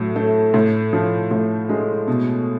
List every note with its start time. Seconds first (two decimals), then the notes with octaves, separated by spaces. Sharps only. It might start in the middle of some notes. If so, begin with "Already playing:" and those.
Already playing: A2 F#3
0.16 A3
0.54 A2
0.93 F3
1.31 A2
1.69 G#3
2.08 B2